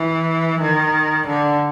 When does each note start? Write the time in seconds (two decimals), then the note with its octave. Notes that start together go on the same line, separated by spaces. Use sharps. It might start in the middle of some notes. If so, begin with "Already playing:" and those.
Already playing: E3
0.60 D#3
1.27 D3